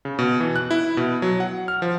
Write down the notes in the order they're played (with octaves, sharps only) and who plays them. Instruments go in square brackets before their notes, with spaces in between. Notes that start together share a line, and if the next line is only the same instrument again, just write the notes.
[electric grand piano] C#3
B2
E3
F#6
E4
B2
F#3
F#5
F6
F3